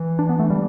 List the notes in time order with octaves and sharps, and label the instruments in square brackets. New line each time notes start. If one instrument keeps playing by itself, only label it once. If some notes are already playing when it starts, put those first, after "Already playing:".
Already playing: [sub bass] E3
[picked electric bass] D4
B3
A3
G3